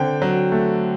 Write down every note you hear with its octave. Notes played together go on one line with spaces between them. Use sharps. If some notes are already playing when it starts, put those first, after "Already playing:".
Already playing: D3 C4 G5
F#3
A3